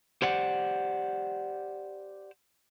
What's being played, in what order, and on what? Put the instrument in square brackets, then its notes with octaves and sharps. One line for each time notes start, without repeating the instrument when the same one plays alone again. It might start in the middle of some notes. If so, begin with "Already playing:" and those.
[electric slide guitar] G4 C5 D5 F#5